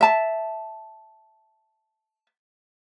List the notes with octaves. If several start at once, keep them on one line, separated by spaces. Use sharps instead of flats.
E5 A5